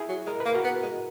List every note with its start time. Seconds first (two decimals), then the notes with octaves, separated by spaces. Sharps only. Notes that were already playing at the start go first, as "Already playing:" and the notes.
Already playing: E4 G#4
0.09 F#3
0.26 G#3 A#4
0.40 B4
0.46 A#3
0.54 F#4 A#4
0.64 B3
0.83 G#3